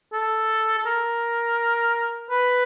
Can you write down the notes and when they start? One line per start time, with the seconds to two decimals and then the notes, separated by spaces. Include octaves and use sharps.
0.13 A4
0.78 A4
0.86 A#4
2.31 B4